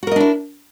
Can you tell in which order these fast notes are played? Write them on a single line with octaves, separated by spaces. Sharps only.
F#4 A#4 D#5 D4 E4